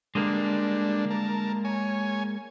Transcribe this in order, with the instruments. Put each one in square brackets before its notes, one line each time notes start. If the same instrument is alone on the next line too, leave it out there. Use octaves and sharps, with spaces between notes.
[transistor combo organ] D3 G3 D4 [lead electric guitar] G#3 A#3
[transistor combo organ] A#4 A5
C#5 G#5